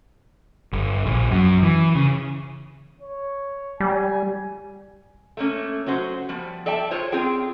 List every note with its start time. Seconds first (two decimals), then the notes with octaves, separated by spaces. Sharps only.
0.73 G1
1.06 A#1
1.31 F#2
1.63 E3
1.95 C#3
3.01 C#5
3.80 G3 G#5
5.37 A3 A#3 C#4
5.86 F#3 C#4 F#4 C5
6.29 F3 G3 B3
6.66 A4 D5 E5 G5 A5
6.91 F4 G#4 C5 C#5
7.12 C4 F4 G#4 G5